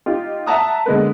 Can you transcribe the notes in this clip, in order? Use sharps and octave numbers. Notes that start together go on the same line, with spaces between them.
D#4 F4 G4
E5 F#5 A5 A#5 D#6
D3 G#3 A#3 B3 B4